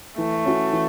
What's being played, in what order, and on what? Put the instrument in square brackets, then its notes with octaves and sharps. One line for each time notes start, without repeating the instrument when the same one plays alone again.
[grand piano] E3 [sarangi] A3
[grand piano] C#4 F#4
E3